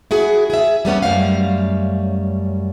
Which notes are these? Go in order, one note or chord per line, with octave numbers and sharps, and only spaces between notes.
E4 F#4 G#4
G#4 E5
G3 A3 B3 C#4
F#2 G3 A3 C#4 F5